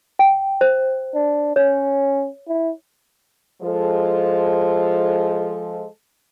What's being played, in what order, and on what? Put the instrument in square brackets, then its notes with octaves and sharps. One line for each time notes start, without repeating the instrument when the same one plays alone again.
[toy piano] G5
C5
[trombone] D4
[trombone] C#4 [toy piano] C#5
[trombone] E4
[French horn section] F3 G#3 A4